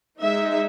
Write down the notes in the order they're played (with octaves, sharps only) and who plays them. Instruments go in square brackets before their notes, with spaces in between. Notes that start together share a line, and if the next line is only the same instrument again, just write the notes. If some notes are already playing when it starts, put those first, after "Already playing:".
[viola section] G#3 D#4 E5